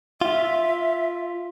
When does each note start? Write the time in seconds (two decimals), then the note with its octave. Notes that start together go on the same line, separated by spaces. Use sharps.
0.21 F4 E5